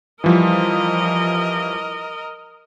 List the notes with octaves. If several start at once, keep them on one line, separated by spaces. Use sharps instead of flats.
E3 F3 G3 A#4 D#5